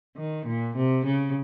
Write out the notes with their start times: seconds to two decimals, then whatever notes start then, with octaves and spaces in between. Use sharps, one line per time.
0.17 D#3
0.46 A#2
0.76 C3
1.06 C#3